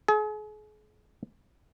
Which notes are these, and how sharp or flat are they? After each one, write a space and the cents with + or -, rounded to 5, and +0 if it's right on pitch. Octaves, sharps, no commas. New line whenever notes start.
G#4 +40